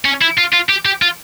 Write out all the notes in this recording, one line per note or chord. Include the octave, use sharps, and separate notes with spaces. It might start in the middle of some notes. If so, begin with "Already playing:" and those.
C#4
E4
F4
F4
G4
G4
F4